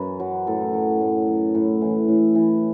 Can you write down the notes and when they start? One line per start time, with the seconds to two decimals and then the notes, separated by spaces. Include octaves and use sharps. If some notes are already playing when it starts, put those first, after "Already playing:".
Already playing: F#2 B4
0.20 F#3
0.47 A2 A4
0.74 F#3
1.01 A2
1.28 F#3
1.55 A2
1.82 E3
2.08 A2
2.35 E3